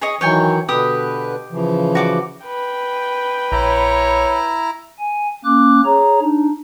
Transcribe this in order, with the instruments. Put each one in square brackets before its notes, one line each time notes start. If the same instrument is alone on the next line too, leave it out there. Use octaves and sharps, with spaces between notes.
[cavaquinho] G#4 C#5 D#5
[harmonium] D#3 E3 F#3 [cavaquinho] C#5 G5 G#5
[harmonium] B2 D3 B4 [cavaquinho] G4 D#6
[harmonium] C#3 E3 F3
[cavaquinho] F#4 D5 D6
[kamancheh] B4 G5
[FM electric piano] A#1 [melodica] E4 A#5 [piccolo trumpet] C#5
[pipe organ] G#5
A#3 C#4 D6 F#6
G#4 C#5 A#5
D4 D#4